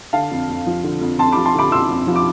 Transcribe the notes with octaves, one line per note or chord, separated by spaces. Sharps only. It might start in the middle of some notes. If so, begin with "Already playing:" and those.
D3 F5 A5
F2
F2
F3
D3
F2
F2 A5 C6
B5 D6
F3
A5 C6
D3 B5 D6
F2 C6 E6
F2
F3
D6